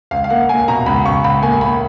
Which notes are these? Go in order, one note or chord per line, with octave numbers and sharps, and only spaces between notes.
C#2 F5
F5
A#3 F#5
A#3 G#5
B2 A#5
C#2 B5
C#2 C#6
C#2 B5
A#3 G#5
A#3 B5